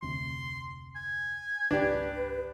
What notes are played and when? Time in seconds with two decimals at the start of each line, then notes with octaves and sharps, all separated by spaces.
0.02 F1 D2 C3 C6
0.96 G#5
1.71 G#1 C#2 D4 G4 B4